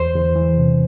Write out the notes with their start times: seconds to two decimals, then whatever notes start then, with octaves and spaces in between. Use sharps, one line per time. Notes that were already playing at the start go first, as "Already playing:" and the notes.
Already playing: E2 C5
0.15 E2
0.36 E3
0.58 C3